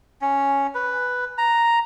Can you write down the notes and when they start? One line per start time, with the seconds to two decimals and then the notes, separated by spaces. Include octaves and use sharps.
0.22 C#4
0.75 B4
1.38 A#5